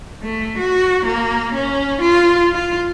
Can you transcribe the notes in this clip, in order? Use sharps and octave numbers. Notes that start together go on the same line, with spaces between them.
A3
F#4
A#3
C#4
F4
F4